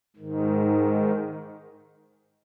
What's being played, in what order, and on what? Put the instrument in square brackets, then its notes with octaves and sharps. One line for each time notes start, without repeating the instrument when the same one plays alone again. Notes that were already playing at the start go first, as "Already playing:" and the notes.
[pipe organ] G#2 D#3